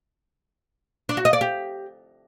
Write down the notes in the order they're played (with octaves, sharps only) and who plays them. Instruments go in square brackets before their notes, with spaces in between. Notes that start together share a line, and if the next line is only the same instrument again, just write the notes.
[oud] D4
F#4
D#5
D5
G4